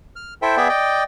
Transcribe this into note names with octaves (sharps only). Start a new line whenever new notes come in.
F6
E4 A4 C5 E5 G5
B3 G#4 D5 E5 G5
D5 D#5 G5